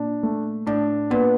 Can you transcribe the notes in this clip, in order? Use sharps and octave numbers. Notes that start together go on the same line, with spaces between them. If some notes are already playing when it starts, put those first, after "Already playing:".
Already playing: A#2 D4
A3
A2 D4
A#2 B3